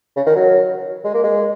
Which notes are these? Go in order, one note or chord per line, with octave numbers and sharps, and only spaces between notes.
C#3
D#3
F#3
G#3
A#3
G#3